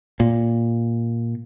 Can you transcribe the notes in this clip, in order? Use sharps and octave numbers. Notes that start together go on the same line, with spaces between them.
A#2